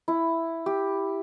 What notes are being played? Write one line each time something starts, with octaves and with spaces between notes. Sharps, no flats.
E4
G4